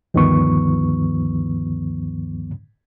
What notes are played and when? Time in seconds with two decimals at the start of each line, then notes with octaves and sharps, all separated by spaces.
0.14 D2 G2 D#3 F3 B3 C#6